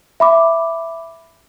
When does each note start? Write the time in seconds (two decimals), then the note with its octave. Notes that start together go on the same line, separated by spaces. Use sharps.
0.20 E5 B5 D6